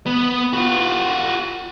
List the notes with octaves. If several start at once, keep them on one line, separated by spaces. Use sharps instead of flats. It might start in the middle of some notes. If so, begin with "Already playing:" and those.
B3
F4 F#4